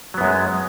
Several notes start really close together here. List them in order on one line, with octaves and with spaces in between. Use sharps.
F#3 B3 F#2 G#3